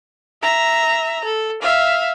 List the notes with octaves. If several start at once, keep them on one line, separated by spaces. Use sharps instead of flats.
E5 A#5
A4
E5 F5